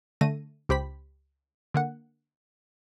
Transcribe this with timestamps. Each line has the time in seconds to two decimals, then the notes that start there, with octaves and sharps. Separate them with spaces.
0.21 D3 A3 A#6 D#7
0.69 C#2 G4 C5 B5 B6
1.74 D3 A#3 F#5